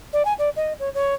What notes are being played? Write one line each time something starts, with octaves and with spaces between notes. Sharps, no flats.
D5
G#5
D5
D#5
C#5
C#5